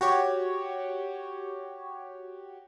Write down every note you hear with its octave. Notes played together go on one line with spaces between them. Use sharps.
F#4 G4 C#5